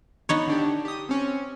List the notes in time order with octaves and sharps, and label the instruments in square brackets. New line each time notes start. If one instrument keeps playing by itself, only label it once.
[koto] B3 D#4 C#5
[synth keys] D3 D4 G4
G4 D#6
C4 C#4